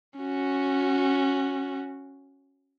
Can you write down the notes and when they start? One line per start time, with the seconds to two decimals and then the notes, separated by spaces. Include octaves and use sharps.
0.19 C#4 F#4